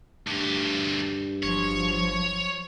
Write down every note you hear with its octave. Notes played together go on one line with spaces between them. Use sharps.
D2 G2 G4
G1 F3 F#3 C#5